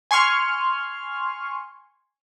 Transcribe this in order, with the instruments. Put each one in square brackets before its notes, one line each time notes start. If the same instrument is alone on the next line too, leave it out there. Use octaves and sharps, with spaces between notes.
[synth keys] G#5 C6 C#6 F6